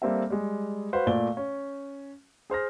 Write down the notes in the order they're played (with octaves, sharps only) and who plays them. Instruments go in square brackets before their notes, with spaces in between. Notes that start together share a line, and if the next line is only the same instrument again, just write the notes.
[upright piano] G3 A#3 C4 A4 E5
G3 G#3
F#4 B4 C5 F5
A#2 A3 D5 G7
C#4
G#4 C5 F6 A#6